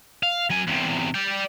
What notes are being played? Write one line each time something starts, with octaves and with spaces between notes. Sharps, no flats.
F5
F#3 G#5
E2 C3
D5 G5